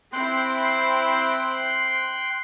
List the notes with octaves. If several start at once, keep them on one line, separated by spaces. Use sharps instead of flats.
C4 E4 C5 G5 C6 F#6